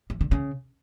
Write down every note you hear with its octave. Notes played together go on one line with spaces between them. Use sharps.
E3
D3
C#3